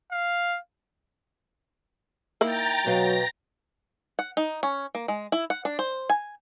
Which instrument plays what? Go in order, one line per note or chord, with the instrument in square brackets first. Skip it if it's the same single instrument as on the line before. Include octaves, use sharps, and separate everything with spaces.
[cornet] F5
[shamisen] A#3 E4 [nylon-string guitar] D#4 [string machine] G5 A#5 A6
[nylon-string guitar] B2 B4 F5 [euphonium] F#3 [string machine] A#6
[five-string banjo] F#5
D#4
C#4
A#3
G#3
E4
F#5
D4
C5
G#5